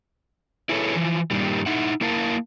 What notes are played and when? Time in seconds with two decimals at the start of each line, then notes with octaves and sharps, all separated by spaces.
0.69 E4 G#4 A4 B4 C#5
0.95 E3 F3
1.31 G2 A#2 D#3 G3
1.66 D#4 E4 F#5
2.01 A#3 E4 A#4 F5 A5